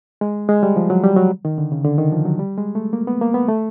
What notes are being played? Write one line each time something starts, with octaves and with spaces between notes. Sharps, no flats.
G#3
G#3
G3
F3
F#3
G3
F#3
D#3
D3
C#3
D3
D#3
F3
F#3
G3
G#3
A3
A#3
B3
A#3
B3
A3